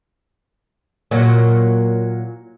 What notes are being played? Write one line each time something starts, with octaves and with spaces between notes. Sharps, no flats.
A#2 F#3